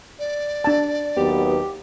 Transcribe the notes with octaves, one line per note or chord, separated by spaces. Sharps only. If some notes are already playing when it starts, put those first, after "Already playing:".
D5
D4 A5
D#2 F#3 B3 G4